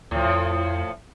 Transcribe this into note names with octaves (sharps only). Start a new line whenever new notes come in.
D2 A2 F3
F2